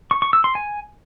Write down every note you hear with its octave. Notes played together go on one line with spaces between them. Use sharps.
C#6
C#6
E6
C6
G#5